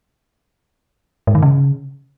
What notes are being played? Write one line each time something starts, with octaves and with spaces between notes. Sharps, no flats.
G#2
D#3
C#3